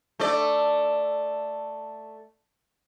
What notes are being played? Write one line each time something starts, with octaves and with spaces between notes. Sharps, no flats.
A3 D5